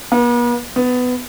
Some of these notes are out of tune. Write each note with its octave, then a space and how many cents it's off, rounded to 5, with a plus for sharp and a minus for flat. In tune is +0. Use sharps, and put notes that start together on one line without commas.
B3 -45
B3 +15